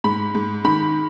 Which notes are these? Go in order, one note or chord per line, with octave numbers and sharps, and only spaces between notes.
G#2 B5
G#2
D#3 B5